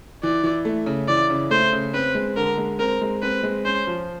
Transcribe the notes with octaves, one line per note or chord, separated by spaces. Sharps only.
E3 D5
E3
A3
C#3
E3 D5
C#3
A3 C5
C#3
C4 B4
G#3
D3 A#4
G#3
C4 A#4
G#3
C4 B4
G#3
C#4 C5
F3